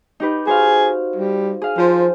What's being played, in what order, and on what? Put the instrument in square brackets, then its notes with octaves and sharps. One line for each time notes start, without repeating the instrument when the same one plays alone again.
[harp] D#4 G4 B4
[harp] F#4 C5 F5 [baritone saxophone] G#4
[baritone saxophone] G3
[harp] G#4 F5
[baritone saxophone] F3 [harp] C5